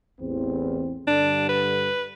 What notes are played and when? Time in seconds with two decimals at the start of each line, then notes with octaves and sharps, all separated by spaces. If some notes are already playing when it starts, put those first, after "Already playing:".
0.21 A1 E2 C4
1.08 G2 D3 D4
1.49 B4